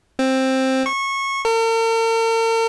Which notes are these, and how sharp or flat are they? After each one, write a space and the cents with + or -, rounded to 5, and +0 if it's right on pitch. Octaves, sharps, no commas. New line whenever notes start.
C4 +10
C#6 -20
A#4 -45